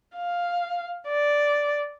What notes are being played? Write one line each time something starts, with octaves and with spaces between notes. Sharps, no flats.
F5
D5